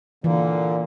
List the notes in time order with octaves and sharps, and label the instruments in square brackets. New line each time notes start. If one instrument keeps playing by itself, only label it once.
[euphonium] A#2 [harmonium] D3 A#3 [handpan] E3